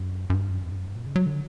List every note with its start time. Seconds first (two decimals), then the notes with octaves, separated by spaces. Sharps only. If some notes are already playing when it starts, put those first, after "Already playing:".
Already playing: F#2
0.30 F#2
0.34 G2
0.50 F#2
0.65 E2
0.71 G2
0.76 F#2
0.86 G2
0.96 A#2
1.06 C#3
1.16 F#3
1.26 D3